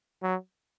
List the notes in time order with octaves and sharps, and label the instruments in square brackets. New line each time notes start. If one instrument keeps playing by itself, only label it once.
[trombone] F#3